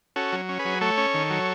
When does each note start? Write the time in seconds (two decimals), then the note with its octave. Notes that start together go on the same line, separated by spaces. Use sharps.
0.16 C#4 F#4 A4
0.33 F#3
0.49 C#4
0.59 G#4 B4
0.65 F#3
0.81 A3 A4 C#5
0.98 C#4
1.14 D#3
1.30 F#3